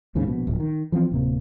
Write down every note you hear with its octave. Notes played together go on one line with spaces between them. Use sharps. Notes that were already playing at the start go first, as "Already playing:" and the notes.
A#1 D#2 G#2 C#3
A#1 B2
D1 A#1
D#3
E3 F3 A3 C4
D1 C3 A#3